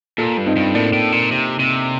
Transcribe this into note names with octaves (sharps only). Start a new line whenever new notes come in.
A#2 F4 A4
G2
C4 D#4
G2
A2 A#3 D4
A2
A#2
C3
C3